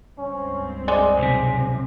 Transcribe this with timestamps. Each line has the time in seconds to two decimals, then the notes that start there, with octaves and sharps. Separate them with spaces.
0.18 C#2 G2 C4 C#4
0.88 G#3 D5
1.19 B1 C3 G#5